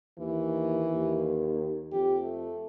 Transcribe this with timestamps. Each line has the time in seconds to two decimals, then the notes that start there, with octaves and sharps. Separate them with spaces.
0.18 D#2 E3
0.92 D#2
1.92 F2 G4
2.22 A3